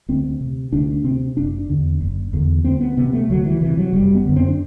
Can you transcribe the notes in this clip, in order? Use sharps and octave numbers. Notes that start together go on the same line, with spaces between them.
D2 C4
C3
D2 D4
D4
C3 C4
F#1 D4
E2 D3
F#1
E2 D3
D2 C4
B3
C3 B3
A3
D2 F#3
E3
C3 E3
F#3
F#1 G3
B3
F#2 D3
C4
D4